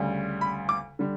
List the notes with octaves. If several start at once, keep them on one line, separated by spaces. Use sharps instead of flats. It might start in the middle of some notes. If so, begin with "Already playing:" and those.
Already playing: D2 C#3 G3
B5
D6
D3 G3